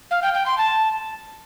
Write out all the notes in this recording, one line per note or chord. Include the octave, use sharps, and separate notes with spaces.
F5
G5
G5
C6
A5